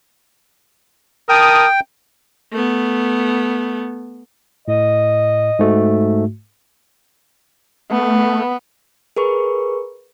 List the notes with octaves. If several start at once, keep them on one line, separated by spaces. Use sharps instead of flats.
A#4 G5 A5 D#6
A3 B3
A2 D#5
G#2 A3 F#4
A3 B3
G#4 A#4 B4 C#6